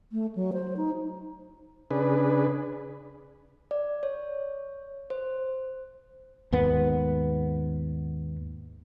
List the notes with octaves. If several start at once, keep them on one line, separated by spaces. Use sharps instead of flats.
A3
F#3
C5
D#4
C#3 D4 G#4 B4
D5
C#5
C5
D#2 G#2 B3